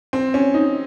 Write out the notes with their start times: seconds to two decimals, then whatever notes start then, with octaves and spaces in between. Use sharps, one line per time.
0.13 C4
0.34 C#4
0.54 D#4